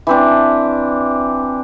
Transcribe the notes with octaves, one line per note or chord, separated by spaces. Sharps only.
E3 C4 D4